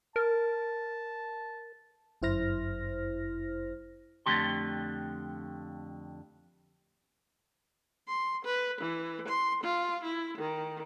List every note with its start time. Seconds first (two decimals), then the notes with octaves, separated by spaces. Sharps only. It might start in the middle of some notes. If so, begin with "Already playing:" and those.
0.16 A#4 A5
2.22 G1 F#2 E4 C5 F6 A#6
4.26 F2 D3 E3 A3 G4 C6
8.08 C6
8.45 B4
8.81 E3
9.28 C6
9.63 F4
10.04 E4
10.38 D#3